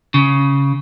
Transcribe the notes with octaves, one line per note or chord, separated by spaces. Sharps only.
C#3